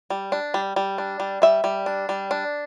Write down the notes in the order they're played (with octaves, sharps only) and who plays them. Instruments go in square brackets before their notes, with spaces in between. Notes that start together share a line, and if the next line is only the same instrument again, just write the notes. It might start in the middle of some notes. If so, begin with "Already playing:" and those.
[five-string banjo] G3
D4
G3
G3
D4
G3
G3 E5
G3
D4
G3
D4